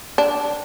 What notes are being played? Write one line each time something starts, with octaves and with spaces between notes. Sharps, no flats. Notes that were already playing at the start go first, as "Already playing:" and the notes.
D4